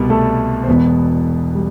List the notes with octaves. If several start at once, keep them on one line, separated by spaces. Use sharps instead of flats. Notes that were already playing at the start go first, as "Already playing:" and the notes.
Already playing: C2 B2 G3
A3 A4
C5
E1 E2 B2 B3 B4
G3